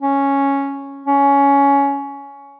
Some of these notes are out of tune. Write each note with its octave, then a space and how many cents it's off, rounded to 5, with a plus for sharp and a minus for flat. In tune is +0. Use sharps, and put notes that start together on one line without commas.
C#4 +0
C#4 +15